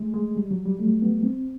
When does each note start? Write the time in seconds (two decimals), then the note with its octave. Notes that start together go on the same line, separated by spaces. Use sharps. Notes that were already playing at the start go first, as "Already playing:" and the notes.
Already playing: G#3 A3
0.14 G#3
0.36 G3
0.51 F#3
0.65 G3
0.79 A3
1.02 B3
1.23 C4